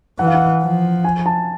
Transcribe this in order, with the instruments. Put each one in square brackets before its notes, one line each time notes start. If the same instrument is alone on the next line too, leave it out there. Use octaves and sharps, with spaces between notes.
[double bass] E3 [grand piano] F#5
[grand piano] F5
F#5
[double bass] F3
[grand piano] G#5
A5